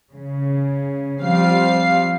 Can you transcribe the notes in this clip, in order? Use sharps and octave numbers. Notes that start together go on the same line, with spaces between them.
C#3
F3 G3 C4 F5 C7